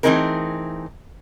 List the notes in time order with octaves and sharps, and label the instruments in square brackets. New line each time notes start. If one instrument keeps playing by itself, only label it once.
[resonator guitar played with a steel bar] E3 A3 C4 D#4 G#4 A#4